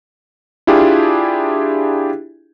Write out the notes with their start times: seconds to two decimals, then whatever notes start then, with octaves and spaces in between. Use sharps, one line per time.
0.67 D4 E4 F4 G4 G#4